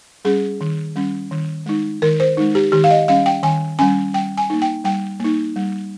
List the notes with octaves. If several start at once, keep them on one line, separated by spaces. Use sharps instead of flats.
G3 C#4 G#4
D#3
G3 C#4
D#3
G#3 D#4
D#3 A#4
C5
G#3 D#4
G4
D#3 G4
F5
D#5
G3 C#4 F5
G5
D#3 G#5
G3 C#4 G#5
G3 G5
G#5
A#3 D#4
G5
G3 G5
A#3 D#4
G3